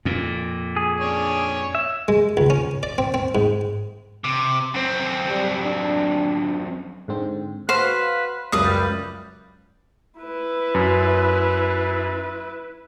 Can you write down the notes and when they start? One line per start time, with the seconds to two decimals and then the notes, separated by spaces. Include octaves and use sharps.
0.05 F2 A#2
0.76 G#4
1.00 D4 C#5 G#5
1.75 E5
2.08 G#3
2.37 C#2
2.50 C#4
2.83 D5
2.98 C4
3.14 C4
3.35 G#2
4.24 C3
4.74 F#2 C4
5.29 G3
5.63 D4
7.08 G#2 D3 C4
7.69 F#4 B4 C5 F5
8.52 C#2 F#2 B4 D5 E5 F5 D#6
8.64 G3
10.20 E4 B4
10.74 F#2